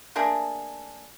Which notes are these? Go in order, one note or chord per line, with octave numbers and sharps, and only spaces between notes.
A3 A#3 D4 G#4